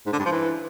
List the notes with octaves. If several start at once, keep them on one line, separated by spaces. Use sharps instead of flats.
G#2
D3
G2
F3
E3